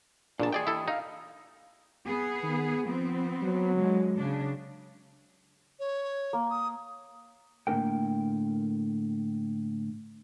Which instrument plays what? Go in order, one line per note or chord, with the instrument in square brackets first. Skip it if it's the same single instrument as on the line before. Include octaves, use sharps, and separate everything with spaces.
[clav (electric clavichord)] A#2 A5 [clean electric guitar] D4 G#4 A#4
[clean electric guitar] G4 D#5 [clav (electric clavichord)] G#4 D5 G5
[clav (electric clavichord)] E4 A4
[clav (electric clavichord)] D#4 [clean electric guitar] F5
[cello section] B3 G#4
[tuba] D#3
[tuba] F3 [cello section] B3 C4
[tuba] F#3
[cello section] D3 G#3
C#3 D4
[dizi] C#5
[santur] A#3
[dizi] D#6
[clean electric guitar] A2 D3 A#3 C#4 A#4 G5